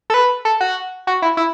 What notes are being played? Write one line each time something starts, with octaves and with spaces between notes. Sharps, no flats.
A4
B4
A4
F#4
F#4
E4
E4